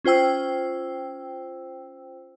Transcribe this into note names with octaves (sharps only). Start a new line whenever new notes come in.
C#4 F4 C5 G5 E6